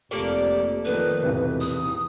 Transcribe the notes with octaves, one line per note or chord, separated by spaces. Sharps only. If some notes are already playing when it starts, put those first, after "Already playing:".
F1 F2 A#3 G4 A4 D5
D#3 F3 A3 B3 B4
B1 E2 A2 C3
D#6